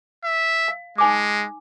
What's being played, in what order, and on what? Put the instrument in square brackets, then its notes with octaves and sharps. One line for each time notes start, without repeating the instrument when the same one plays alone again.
[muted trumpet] E5
[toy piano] F5
[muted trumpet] G#3 [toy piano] D#4 G#5 D6